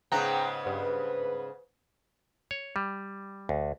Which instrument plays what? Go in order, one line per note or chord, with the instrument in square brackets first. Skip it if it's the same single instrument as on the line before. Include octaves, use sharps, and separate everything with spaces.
[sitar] G#2 C#3 B3 [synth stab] G5 A#5 F#6
[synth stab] G2 [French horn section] B4
[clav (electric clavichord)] C#5
G3
D2